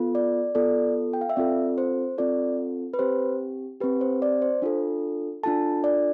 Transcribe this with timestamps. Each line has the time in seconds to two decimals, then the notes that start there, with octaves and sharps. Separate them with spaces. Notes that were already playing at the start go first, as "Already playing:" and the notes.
Already playing: B3 F4 A4
0.15 D5
0.55 B3 F4 A4 D5
1.13 G5
1.21 F5
1.29 E5
1.36 C4 F4 A4 D5
1.78 C5
2.18 C4 F4 A4 D5
2.94 B4
2.99 C4 G4 C5
3.80 C4 G4 B4
4.01 C5
4.22 D5
4.42 C5
4.62 D4 F4 A4
5.43 D4 F4 A4 A5
5.84 D5